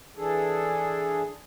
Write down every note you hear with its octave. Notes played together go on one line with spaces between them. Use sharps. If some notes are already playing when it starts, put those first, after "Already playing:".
E3 D4 G#4 A4